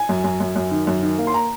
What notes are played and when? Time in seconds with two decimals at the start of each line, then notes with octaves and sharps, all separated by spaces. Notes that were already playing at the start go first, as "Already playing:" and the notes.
Already playing: G#5
0.09 F#2
0.24 F#2
0.40 F#2
0.56 F#2
0.71 D#3
0.87 F#2
1.03 D#3
1.18 A#3
1.27 C6
1.34 A#5